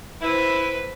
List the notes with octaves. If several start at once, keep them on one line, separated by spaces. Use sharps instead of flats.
E4 B4 C5